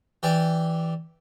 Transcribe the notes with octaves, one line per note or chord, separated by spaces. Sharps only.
E3 G4 D5